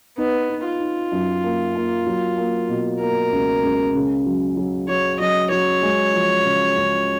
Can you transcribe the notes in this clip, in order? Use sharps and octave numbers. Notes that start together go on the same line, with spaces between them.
B3 D#4
D#4
F4
D#4
F#2
A#3
A#3
F#3
A#3
B2
A#3 A#4
C#2
C#2
C#3
F#3
F#3
F#3 C#5
F#3 D#5
F#3 C#5
G#3
F3
C#3
C#2